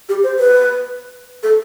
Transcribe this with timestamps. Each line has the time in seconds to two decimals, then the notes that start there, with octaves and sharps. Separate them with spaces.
0.09 G4
0.24 C5
0.39 B4
1.43 A4